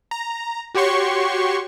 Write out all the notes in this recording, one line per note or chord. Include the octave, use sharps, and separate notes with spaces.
A#5
F#4 G4 C#5 C6 C#6